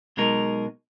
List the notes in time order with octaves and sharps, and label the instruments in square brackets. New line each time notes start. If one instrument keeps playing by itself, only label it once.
[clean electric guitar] B1 B2 G#3 D#4 A#4